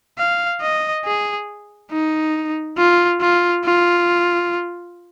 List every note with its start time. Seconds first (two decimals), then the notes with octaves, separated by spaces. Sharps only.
0.18 F5
0.62 D#5
1.05 G#4
1.91 D#4
2.77 F4
3.21 F4
3.65 F4